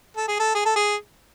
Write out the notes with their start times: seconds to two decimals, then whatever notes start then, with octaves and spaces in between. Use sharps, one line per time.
0.17 A4
0.28 G#4
0.40 A4
0.55 G#4
0.65 A4
0.76 G#4